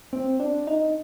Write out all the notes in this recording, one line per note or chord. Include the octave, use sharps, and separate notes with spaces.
C4
D4
D#4